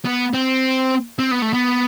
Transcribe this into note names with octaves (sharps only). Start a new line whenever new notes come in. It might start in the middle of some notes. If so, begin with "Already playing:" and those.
B3
C4
C4
B3
A3
B3